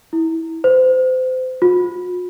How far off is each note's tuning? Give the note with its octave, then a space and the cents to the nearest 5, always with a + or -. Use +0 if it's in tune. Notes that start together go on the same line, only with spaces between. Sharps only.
E4 -20
C5 -30
F4 +45